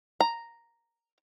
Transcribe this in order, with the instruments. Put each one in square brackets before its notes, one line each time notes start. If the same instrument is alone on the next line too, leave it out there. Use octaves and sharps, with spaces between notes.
[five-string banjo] A#5